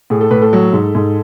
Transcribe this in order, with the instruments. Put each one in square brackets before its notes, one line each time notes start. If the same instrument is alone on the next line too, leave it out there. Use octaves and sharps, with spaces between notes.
[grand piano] A2 G#4
A4
A2 B4
A4
F#3
G#2
G#2